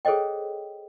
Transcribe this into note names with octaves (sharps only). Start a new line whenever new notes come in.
G#4 A4 C5 C#5 D#5 G5